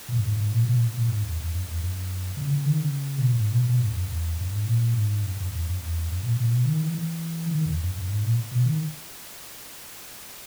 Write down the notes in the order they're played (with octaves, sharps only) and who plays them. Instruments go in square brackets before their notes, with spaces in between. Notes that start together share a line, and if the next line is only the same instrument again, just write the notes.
[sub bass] A#2
F#2
G#2
G#2
A#2
B2
A#2
A#2
G#2
E2
E2
F#2
E2
F#2
C#3
C#3
D#3
C#3
B2
A#2
G#2
B2
B2
G#2
E2
F#2
E2
F#2
G#2
A#2
G#2
F#2
F#2
E2
F#2
E2
F#2
A#2
A#2
B2
D#3
E3
E3
D#3
E2
F#2
F#2
G#2
A#2
B2
D#3